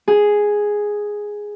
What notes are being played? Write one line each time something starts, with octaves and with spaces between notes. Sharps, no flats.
G#4